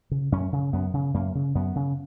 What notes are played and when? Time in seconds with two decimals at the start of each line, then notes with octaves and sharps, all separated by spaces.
0.11 C#3
0.32 F#2 C#4
0.53 C#3
0.73 F#2 B3
0.94 C#3
1.14 F#2 A#3
1.35 C#3
1.55 F#2 B3
1.75 C#3